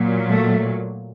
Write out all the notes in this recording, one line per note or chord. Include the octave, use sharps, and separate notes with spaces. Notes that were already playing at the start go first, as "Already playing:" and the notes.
Already playing: A#2 F#3
A3